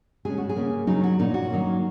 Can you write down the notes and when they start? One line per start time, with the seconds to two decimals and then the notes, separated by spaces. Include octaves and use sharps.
0.25 C#3 G#3 C#4 G#4
0.38 F#4
0.49 G#4
0.56 C#3 A#3 C#4
0.87 C#3 F#3 C#4 D#4
1.03 F#4
1.19 A#2 A#3 C#4 D#4
1.34 F#4
1.50 D#3 F#3 A#3 C#4